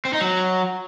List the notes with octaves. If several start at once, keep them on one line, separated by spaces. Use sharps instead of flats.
C4
D#4
F#3